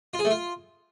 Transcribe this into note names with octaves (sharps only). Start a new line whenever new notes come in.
F4
G#4
A3
F4